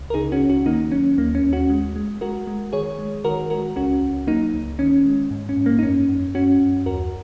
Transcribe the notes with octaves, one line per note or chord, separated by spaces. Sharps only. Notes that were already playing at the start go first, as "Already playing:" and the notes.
Already playing: C#2
A#4
C#3 D#4 G#4
C#4 F#4
C#2
C#4 F#4
D#3 A#3 D#4
F#3 C#4
D#2 A#3
C#4
D#2
C#4 F#4
G#3
G#3
G#3 F#4 A#4
G#3
D#3 G#4 C#5
G#3
D#3 F#4 A#4
G#3 F#4 A#4
C#2 C#4 F#4
C#2
F#3 A#3 D#4
C#2
D#3 C#4
G#3
G#2
C#4
G#2
A#3
D#4
F#2 C#4
F#2
F#2 C#4 F#4
F#2
D#2 F#4 A#4